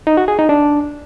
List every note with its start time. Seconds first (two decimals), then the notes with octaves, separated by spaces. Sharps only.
0.07 D#4
0.17 F#4
0.28 G#4
0.39 D#4
0.49 D4